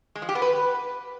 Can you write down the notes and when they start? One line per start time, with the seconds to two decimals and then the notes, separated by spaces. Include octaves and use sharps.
0.15 G#3
0.22 F3
0.29 G4
0.35 B3
0.42 B4